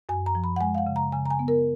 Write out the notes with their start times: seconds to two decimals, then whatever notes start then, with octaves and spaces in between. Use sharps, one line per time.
0.09 F#2 G#5
0.26 A#5
0.35 F3
0.44 B5
0.56 F#5
0.61 G#3 G#5
0.75 F5
0.78 F#5
0.87 C#3
0.96 A#5
1.12 C#3 G#5
1.26 A#5
1.31 G#5
1.39 B3
1.48 A#4